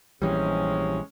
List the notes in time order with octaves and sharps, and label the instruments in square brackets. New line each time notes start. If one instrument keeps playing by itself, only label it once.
[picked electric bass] A#1 E3 G3 [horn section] C3 G#3 C#4